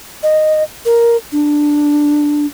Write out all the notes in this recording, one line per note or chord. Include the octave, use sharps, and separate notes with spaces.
D#5
A#4
D4